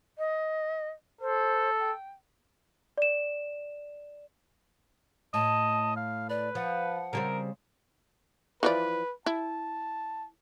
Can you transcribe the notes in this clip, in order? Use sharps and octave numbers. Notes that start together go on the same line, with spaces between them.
D#5
A4 C5
G5
D5 E7
A2 D#5 A5
F5
B4 D5
F3 F#5
C#3 G3 C4 A#4
E3 F3 B4 D5
E4 A5